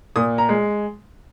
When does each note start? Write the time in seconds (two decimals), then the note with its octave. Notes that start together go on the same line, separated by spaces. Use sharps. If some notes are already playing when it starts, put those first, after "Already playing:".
0.16 A#2 D#6
0.38 A#5
0.49 G#3